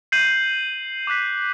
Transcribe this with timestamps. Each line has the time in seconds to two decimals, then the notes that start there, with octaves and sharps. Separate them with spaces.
0.12 G6 C7 D#7 F#7
1.07 D6 F#6 B6